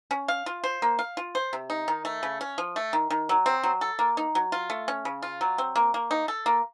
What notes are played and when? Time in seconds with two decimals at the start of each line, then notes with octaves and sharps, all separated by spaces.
0.11 C#4
0.28 F5
0.46 F4
0.64 C5
0.82 A#3
0.99 F5
1.17 F4
1.35 C5
1.53 C3
1.70 D#4
1.88 D#3
2.05 A3
2.23 C#3
2.41 C#4
2.58 F3
2.76 A3
2.93 D#3
3.10 D#3
3.29 F#3
3.46 C4
3.63 F#3
3.81 A4
3.99 A#3
4.17 D#4
4.35 F#3
4.52 F4
4.70 A3
4.88 C#4
5.05 C#3
5.22 F4
5.41 F#3
5.58 C4
5.76 A#3
5.94 A#3
6.11 D#4
6.28 A4
6.46 A#3